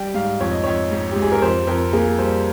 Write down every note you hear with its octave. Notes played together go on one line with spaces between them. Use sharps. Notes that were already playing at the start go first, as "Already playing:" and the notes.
Already playing: G3 G5
G#2 F5
F2 C#5
D#5
F2 C#5
G#2
G#2 G4
G#4
A#4
F2 C5
F2 A#4
A#3 G#4
G3 C5